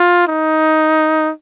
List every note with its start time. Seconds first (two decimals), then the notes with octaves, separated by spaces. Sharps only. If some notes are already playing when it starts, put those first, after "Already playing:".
Already playing: F4
0.27 D#4